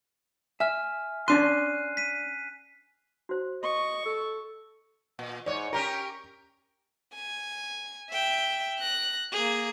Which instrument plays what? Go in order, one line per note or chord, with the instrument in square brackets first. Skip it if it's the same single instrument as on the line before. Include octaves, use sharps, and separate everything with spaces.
[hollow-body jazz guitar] E5 [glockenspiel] G#5 F6
[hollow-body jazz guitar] C#4 D4 C6 [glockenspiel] F#6 C7 D#7
[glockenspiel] B6 D#7
[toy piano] F#4 C5
[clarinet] D#5 [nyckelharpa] C#6
[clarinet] A4
[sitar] A#2
[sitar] G#2 C#5 [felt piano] D5
[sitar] C#4 G4 A#4 [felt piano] A#5
[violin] G#5
E5 G5
F#6 A#6
A#3 G#4